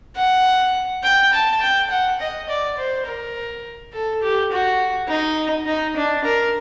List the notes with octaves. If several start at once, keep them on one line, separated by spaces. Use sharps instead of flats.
F#5
G5
A5
G5
F#5
D#5
D5
C5
A#4
A4
G4
F#4
D#4
D#4
D4
A#4